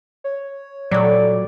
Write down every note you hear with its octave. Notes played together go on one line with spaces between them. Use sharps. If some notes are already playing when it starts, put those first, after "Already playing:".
C#5
A#2 F#3 G3 A3 D5